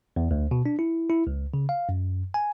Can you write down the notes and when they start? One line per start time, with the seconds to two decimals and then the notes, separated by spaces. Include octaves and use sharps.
0.16 E2
0.31 D2
0.51 B2
0.66 D4
0.79 E4
1.10 E4
1.27 C#2
1.54 C#3
1.69 F5
1.89 F#2
2.34 G#5